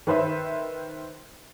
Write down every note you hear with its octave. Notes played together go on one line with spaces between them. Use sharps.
D#3 B4 C5 E5